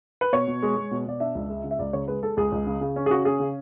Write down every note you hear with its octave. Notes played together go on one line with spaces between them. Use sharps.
B4
B2 C#5
B2
G#3
G#3
B2
B2 D5
D4 E5
C#2
G#3
C#3
E5
C#2 D5
C#3 C#5
G#3 B4
G#3 A4
C#2 G#4
C#2
C#3
C#3
C#4
G#4
C#3 F#4
C#4 G#4
C#3